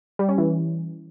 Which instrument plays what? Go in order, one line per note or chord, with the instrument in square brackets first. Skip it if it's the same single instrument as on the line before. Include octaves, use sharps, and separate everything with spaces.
[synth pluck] G3
C#4
E3